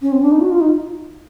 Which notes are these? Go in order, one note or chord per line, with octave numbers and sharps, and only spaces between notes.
C#4
C4
D4
D#4
F#4
F4
D#4